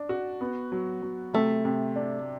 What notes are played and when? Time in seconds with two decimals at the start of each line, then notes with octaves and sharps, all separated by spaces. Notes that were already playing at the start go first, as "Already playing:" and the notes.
Already playing: D4
0.09 F#4
0.41 B3
0.72 F#3
1.02 F#3
1.34 C3 A3
1.65 C3
1.96 D4